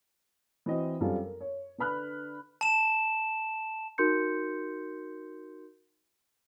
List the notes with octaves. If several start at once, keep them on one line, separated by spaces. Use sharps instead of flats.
E3 C4 F#4 D#5
F#2 G3 C4 F4 A4
A#4
C#5
D3 D4 B4 B5 F6 F#6
A5 E7
D#4 F#4 A#4 C6 G6 C#7